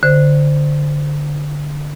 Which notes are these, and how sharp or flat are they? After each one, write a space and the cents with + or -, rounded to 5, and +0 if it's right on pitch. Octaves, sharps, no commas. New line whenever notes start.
D3 +0 C5 -20